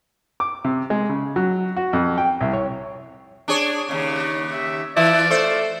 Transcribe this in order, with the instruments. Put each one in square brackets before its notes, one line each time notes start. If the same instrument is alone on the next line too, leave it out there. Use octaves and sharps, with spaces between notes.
[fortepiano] D6
C3
G#3
C#3
F#3
F#4
F2
G5
C2
C#5
[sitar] D4 G#4 C#5
D#2 C#3
[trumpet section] G4 E5
[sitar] E3 [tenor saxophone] E4 [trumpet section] F4 D5
[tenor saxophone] A3 [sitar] C5